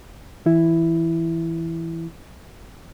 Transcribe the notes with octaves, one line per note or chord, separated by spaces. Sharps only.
E3 E4